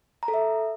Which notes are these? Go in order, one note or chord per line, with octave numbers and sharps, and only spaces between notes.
A#5
A4
E5